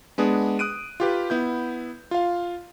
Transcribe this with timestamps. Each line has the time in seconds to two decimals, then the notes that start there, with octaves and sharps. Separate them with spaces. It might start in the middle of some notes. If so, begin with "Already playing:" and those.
0.18 G#3 B3 D4 G#4
0.59 D#6 F#6 D7 D#7
1.00 F4 G4 B4
1.30 B3 E4 G6
2.11 F4 F5